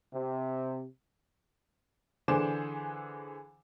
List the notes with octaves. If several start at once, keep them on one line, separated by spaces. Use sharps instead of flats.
C3
D3 E3 G#4 C5 D6 E7